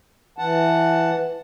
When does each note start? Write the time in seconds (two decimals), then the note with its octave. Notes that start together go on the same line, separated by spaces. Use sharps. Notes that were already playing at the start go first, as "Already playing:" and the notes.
0.38 E3 F#5 A5